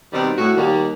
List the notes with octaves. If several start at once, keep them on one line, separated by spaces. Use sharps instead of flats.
B2 D#3 G3 C4
A2 F#4
D#2 D#3 G3 A#3